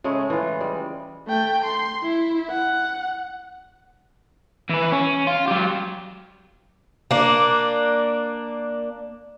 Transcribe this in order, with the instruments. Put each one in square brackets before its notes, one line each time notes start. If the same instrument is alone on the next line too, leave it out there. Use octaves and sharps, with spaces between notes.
[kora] C#3 G#3 A3
E3 F4
G3 G#3
[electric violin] A3 G5
C6
E4
F#5
[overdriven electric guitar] E3 B4
C#4
F4
F#3 G4
[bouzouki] A#3 D4